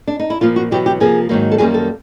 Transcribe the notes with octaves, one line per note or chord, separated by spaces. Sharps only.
D4
D#4
E4
A#2 F3 A#3 F4
F#4
E2 B2 F#3 G4
G4
C3 F3 A#3 G#4
G#2 D#3 F#3 A#3
A4
F#2 D#3 G3 A#3 G#4
A4